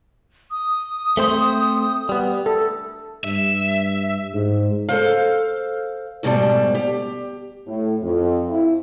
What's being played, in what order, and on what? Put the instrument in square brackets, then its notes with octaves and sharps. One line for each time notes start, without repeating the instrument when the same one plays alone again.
[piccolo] D#6
[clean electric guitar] A3 C4 C5
G3 B3
[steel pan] A4
[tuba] G2 [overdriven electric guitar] E5
[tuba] G#2
[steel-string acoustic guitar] A4 C5 F5
D2 G#2 B2 G3 A5
G4
[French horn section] A2
F2
E4